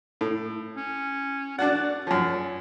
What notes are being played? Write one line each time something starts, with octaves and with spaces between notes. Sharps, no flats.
A2
C#4
D4 F#4 D5 F#5
F#2 F3 C#5